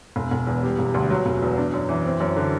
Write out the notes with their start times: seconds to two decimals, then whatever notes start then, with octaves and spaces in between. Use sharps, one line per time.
0.16 E1
0.31 E1
0.47 E2
0.63 G3
0.78 E1
0.94 D2
1.10 F#3
1.26 E1
1.42 E2
1.58 D4
1.73 F#2
1.89 E3
2.06 C4
2.20 F#2
2.36 D3